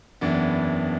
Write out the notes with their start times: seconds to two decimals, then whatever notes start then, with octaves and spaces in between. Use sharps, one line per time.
0.21 F#1 E2 E3 B3 D4